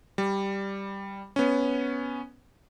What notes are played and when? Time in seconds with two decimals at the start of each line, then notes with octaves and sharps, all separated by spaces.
0.18 G3
1.36 B3 C#4